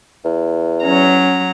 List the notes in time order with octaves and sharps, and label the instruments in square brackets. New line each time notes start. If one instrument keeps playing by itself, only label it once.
[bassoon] E2
[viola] F#3 A#5 [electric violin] C#4